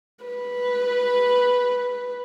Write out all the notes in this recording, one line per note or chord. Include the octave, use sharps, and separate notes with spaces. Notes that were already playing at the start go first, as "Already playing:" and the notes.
B4